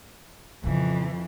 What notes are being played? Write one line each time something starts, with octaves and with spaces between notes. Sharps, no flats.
F2 A#2 C#3 E3